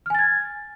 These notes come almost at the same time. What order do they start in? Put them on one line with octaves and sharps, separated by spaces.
F6 G#5 A6 G#6